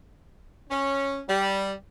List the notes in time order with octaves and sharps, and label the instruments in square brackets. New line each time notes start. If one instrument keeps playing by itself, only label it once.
[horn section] C#4
G3